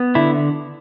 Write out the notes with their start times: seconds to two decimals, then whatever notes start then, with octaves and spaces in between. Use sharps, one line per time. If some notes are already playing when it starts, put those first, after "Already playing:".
Already playing: B3
0.15 D3 E4